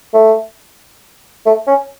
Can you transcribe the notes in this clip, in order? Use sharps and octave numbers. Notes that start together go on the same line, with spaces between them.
A3
A3
C#4